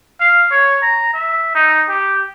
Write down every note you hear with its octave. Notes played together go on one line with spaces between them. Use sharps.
F5
C#5
A#5
E5
D#4
G4